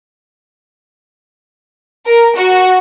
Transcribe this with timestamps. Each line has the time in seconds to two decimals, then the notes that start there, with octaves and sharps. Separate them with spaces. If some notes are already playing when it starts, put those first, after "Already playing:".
2.06 A#4
2.36 F#4